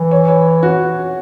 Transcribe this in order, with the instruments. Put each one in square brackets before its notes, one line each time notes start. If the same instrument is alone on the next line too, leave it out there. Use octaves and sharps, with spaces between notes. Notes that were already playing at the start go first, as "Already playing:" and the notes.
Already playing: [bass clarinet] E3
[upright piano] C#5
C#5
F#4